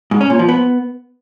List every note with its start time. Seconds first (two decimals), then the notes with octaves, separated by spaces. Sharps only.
0.11 G#2
0.21 C#4
0.30 A#2
0.39 F3
0.49 B3